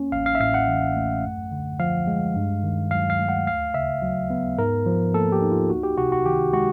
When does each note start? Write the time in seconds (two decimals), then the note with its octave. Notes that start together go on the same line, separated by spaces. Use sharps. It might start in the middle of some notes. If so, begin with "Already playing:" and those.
Already playing: A#3 C#4
0.12 A1 F5
0.26 F5
0.35 E5
0.40 A2 F5
0.54 F#5
0.68 E3
0.96 A3
1.24 F#2
1.52 D3
1.80 F3 F5
2.07 G#3
2.36 G2
2.63 D#3
2.91 F#3 F5
3.10 F5
3.19 A3
3.29 F#5
3.47 D2 F5
3.74 C#3 E5
4.02 F#3
4.30 B3
4.58 G#2 A#4
4.86 F3
5.14 A#3 A4
5.32 G4
5.42 D#4
5.51 F4
5.70 C#2 F#4
5.83 G4
5.98 C3 F#4
6.12 F#4
6.25 D#3 G4
6.53 G#3 F#4